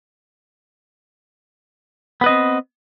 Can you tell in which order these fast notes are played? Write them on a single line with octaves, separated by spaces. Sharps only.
B3 B4 D#5 C4